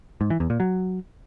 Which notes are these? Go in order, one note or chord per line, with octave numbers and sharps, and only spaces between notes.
G#2
E3
E2
A#2
F#3